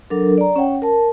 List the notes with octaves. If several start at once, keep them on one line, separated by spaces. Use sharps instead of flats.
F#3 D4 A4 A#4
D5 A#5
C#4 C#5 F#5 G5
A#4 A5